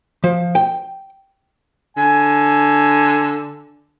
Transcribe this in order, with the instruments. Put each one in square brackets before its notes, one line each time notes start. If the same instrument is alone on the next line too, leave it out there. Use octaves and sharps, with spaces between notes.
[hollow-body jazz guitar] F3
G5
[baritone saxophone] D3 [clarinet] G#5